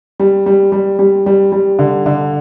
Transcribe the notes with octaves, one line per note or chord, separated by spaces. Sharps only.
G3
G3
G3
G3
G3
G3
D3
D3